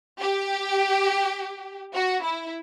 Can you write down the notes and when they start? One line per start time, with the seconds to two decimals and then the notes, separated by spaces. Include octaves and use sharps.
0.20 G4
1.94 F#4
2.23 E4